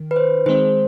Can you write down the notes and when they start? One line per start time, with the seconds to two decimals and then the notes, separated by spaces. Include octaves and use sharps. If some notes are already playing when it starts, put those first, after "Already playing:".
Already playing: D#3
0.11 B4
0.16 C5
0.46 D#3 G#3 C4 C5